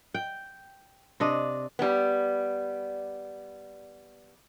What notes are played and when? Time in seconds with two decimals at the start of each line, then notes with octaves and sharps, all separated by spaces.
0.14 G5
1.20 C3 D4 D#5
1.79 G3 B3